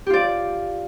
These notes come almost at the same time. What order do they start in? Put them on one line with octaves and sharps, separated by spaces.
G4 F4 D5